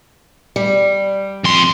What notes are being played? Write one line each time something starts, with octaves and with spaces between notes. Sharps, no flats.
G3
F2 C6